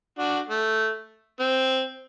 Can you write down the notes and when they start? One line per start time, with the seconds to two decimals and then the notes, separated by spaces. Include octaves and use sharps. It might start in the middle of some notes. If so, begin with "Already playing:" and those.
0.19 D4 F#4
0.49 A3
1.40 C4